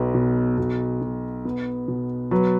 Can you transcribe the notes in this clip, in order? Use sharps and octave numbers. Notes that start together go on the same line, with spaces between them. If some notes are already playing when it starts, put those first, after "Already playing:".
Already playing: B1 B4
B2
B1
B2
B3
B2
F#3 B4